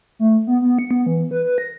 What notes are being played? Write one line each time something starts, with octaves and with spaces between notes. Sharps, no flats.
A3
B3
B3
C#7
B3
E3
B4
B4
A#6